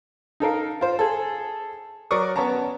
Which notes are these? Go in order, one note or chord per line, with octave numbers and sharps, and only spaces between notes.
D#4 A4 A#4 F5
F4 C5
G#4 A4
F#3 A#4 D5 C#6 D#6
B3 C#4 C#5 A5 A#5